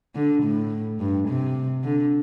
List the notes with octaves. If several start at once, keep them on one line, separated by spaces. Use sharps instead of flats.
D3
A2
G2
C3
D3